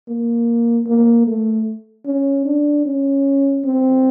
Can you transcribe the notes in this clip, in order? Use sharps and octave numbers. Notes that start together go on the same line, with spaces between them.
A#3
A#3
A3
C#4
D4
C#4
C4